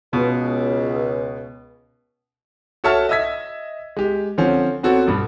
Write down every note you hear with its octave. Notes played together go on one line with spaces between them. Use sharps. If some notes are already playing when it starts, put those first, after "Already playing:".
C#2 B2
F#4 A4 C#5 E5 A5 F6
D#5 E5 E6 G#6 B6
G#3 G4
D3 F3 C4 C#4
B3 C4 F#4 A4 C#5
G2 B2 A4